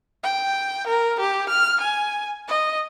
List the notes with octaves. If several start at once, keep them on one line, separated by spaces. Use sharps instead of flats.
G5
A#4
G4
F6
G#5
D#5